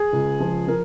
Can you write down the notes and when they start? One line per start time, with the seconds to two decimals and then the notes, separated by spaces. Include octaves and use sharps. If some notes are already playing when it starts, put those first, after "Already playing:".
Already playing: G#4
0.13 C#2
0.40 F3
0.67 F3 A#4